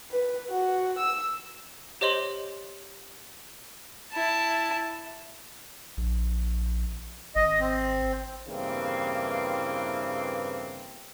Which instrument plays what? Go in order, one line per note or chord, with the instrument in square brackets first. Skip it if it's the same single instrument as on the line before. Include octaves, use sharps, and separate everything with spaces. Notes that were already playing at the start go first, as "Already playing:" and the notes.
[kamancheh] B4
F#4
E6
[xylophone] G4 C5 C#5 D#5 C6 F#7
[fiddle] E4 A5
[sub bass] A#1
[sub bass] G#1 [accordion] D#5
[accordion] C4
[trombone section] E2 G2 C#3 E3 A#3 C4